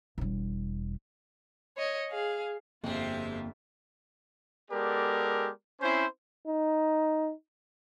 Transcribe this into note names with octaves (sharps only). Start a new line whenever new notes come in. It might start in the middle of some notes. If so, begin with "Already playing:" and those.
E1 G3
C#5 D#5
G#4 F5
G1 F2 G#3 A#3 C4 F4 G4 E5
G#3 B3 G4 A4 A#4 D5
C4 C#4 E4 C5
D#4